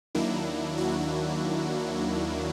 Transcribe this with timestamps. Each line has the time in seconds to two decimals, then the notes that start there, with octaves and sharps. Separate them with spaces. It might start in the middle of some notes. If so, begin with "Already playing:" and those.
0.15 D#2 D#3 F#3 A#3 D4 E4
0.78 E4 F#4